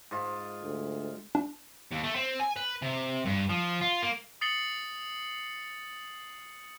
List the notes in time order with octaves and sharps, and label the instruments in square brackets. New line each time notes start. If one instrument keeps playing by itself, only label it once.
[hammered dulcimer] G#2 F4
[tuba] D2
[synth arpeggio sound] D4
[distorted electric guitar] D#2
A3
C4
G#5
B4
C3
G2
F3
F4
A#3
[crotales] D#6 A6 C7 C#7 F#7 G7